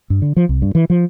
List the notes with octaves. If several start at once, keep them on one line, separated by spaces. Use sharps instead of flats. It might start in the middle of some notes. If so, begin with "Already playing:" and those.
G2
D3
F3
C2
G2
E3
F3